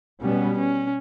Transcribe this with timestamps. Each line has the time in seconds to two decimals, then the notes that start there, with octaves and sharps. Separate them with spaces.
0.21 B2 G3 B3 C#4
0.58 C#4